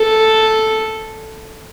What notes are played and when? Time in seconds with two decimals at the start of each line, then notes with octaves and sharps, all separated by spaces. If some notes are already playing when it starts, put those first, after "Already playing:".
Already playing: A4